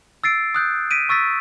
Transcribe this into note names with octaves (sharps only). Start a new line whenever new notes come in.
E6 A6 C7 D7
D#6 F#6 G6
B6 D7 D#7
C#6 E6 A6 B6